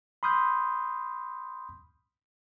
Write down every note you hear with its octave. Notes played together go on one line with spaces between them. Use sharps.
B5 C6 D#6 F6 G6